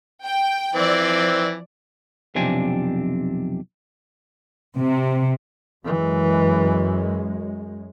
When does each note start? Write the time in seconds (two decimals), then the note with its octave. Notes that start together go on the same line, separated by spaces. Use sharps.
0.24 G5
0.75 E3 F3 C4 D5
2.35 B1 F2 C3 C4 D4 G#5
4.76 C3
5.85 F#2 E3 G#3